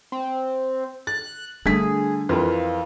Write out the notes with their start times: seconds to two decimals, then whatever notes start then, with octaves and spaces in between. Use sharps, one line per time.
0.12 C4
1.07 F#6 A6
1.66 D3 G3 A3 D4 G#4 B6
2.29 F2 E3 F4 A#4 B4